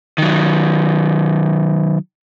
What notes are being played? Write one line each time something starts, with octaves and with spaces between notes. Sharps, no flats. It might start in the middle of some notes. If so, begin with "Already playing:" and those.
D#3 F#3